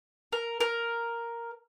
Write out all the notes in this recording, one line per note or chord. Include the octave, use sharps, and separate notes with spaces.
A#4
A#4